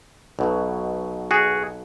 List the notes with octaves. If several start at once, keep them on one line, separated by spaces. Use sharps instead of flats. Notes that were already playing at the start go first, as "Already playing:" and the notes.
B1 B2 F#3
F#4 G#4